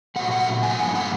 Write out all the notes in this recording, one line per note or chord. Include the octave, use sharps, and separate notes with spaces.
A#2 F#3 A3 F#5
F#5
G#5
G2 D3 F3 A#3 F#5
F#5